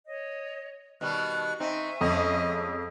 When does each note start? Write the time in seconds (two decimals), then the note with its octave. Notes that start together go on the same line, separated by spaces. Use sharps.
0.07 C#5 D#5
1.01 B2 D#3 G3 C#6 F#6
1.60 C4 D#4 E5 G#5 C#6
2.01 F2 G#3 A3 C#4 D#5